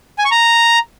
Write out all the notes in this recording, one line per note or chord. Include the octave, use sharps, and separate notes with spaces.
G#5
C#6
A#5